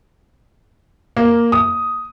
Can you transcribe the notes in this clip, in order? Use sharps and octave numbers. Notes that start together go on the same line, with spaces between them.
A#3
D#6